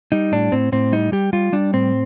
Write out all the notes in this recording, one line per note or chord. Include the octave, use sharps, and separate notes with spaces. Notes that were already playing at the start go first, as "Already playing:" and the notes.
G3 D#4
A2 D4
A2 C4
A2 C4
G3 D#4
G3 G4
G3 F4
G3 D4
A2 C4